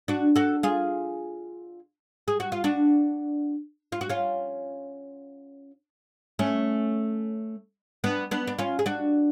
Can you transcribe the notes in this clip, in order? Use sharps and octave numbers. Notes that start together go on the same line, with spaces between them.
D4 F#4
F#4 A4
F4 G#4
G#4
F#4
F4
D4 F#4
F4
F#4
C#4 F4
A3 C#4
B3 D4
B3 D4
D4
C#4 F4
G#4
D4 F#4